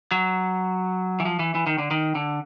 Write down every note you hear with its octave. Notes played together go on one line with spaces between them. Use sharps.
F#3
E3
F3
E3
E3
D#3
D3
D#3
D3